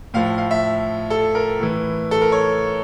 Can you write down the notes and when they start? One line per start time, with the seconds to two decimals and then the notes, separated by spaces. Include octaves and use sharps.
0.14 A2 F3 F5
0.38 F5
0.51 E5
1.10 A4
1.35 A#4
1.60 A2 E3
2.11 A4
2.21 A#4
2.32 C#5